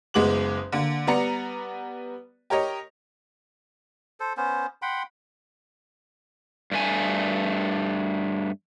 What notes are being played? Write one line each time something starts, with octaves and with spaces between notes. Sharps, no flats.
F#1 G#3 B3 D6 F#7
D3 A#3
G3 B3 D5 A#5 C#7
G4 A#4 C#5 D#5
A4 C5
B3 C#4 C5
F#5 G5 B5 C6
G2 A3 G#5